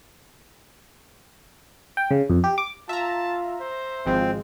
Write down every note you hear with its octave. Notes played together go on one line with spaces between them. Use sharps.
G5
C#3
F2
G4
D6
F4 E5 A5 A#5
C5
G#1 F3 G#3 C4